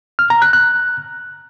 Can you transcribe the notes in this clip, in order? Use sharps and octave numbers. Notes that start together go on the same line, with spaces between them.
F6
A#5
F#6
F#6